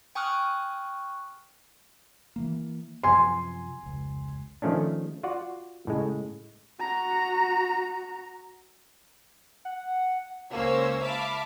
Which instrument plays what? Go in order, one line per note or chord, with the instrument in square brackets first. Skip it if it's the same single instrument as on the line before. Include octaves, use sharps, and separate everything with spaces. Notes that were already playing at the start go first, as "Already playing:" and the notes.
[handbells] G5 G#5 C#6 D#6 F6 F#6
[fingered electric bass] E3 F3 A#3
[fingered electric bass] F#2 C3 F3 [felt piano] G#5 C6
[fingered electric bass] F1 C#2
[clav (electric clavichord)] D#3 F3 A3 C#4 D4
F4 F#4 D5 F#5
A2 C#3 G#3
[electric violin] F#4 A#5
[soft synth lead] F#5
[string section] C#2 A#3 C#4 C5 C#5 E6
E5 F5 A5 B5 D6